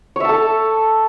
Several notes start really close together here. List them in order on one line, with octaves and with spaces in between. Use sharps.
C#5 E5 A5 A4